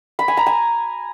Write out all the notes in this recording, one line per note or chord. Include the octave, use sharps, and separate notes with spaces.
B5
G#5
A#5
G#5